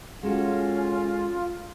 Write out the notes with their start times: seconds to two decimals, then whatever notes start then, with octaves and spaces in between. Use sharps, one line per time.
0.23 G#3 C#4 F4 F#4 A4